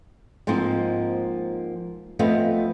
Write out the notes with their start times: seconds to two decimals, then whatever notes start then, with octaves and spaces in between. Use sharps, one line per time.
0.47 G#2 F3 A#3 C4 D#4
2.19 F3 A3 B3 C4 D#5 F5